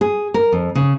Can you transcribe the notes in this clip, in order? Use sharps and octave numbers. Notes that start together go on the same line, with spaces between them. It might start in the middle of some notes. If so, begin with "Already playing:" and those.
G#4
A#4
F2
C#3